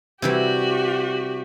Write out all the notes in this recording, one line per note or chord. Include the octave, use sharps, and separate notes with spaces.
C3 E3 G3 F#4 G4